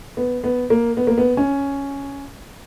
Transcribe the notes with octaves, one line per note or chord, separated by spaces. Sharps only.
B3
B3
A#3
B3
A#3
B3
C#4